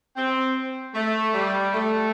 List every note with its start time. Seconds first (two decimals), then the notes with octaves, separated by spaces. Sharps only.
0.16 C4
0.94 A3
1.34 G3
1.73 A3